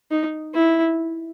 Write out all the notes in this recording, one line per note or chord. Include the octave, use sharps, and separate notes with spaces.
D#4
E4